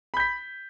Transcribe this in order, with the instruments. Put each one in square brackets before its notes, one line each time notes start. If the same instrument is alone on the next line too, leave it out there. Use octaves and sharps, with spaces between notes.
[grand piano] B5
G6
B6